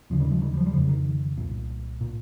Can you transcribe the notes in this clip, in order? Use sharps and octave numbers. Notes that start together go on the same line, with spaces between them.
D#2 C#3 F3
D#3 G3
F3 G#3
D#3 G3
G3
F3
G3
F2 C#3 F3
D#3
C2 A#2
A#2